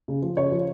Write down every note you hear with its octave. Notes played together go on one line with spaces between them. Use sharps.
C#3
F3
C#3 C#5
F3